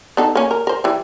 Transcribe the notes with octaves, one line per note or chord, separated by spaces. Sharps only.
B3 D#4 A4
A#3 C#4
A#4
A#4 C5
E3 G3